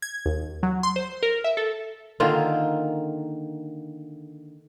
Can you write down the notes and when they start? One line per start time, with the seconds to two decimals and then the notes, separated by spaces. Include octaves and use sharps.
0.02 G#6
0.26 D#2
0.63 F#3
0.83 C6
0.96 C5
1.23 A#4
1.44 E5
1.57 A4
2.20 D3 D#3 A#3 F4